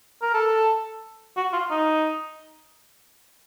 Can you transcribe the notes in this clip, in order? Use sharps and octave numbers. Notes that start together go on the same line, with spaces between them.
A#4
A4
F#4
F4
D#4